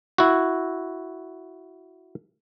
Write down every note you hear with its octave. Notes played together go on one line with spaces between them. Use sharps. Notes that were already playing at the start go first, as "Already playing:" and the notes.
E4 F#4